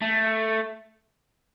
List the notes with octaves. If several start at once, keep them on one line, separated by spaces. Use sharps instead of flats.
A3